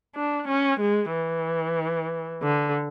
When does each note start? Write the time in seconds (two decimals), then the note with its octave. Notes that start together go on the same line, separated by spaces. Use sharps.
0.16 D4
0.48 C#4
0.80 G#3
1.13 E3
2.43 D3